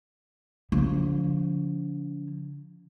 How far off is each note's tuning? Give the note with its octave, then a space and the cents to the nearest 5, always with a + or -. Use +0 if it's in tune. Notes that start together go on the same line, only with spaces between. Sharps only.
D3 -40 F3 +0